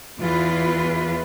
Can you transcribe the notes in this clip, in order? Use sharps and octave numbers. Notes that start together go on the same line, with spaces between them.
E2 E3 F4 B4